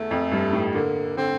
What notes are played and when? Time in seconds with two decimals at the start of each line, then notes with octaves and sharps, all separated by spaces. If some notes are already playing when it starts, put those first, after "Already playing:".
Already playing: E2 D3 A3
0.11 F2
0.31 G2
0.53 A2
0.75 D3 A#3
1.17 D3 C4